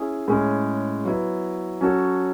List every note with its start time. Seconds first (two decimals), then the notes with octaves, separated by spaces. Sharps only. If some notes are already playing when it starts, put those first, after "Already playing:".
Already playing: C#4 E4 G#4
0.28 A2 G#3 C#4 G#4
1.05 F#3 B3 E4
1.81 F#3 C#4 F#4 A4